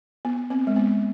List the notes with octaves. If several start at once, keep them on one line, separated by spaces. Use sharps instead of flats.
B3
C4
G#3
B3